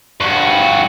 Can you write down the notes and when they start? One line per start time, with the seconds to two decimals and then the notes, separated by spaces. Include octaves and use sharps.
0.20 G2 F#4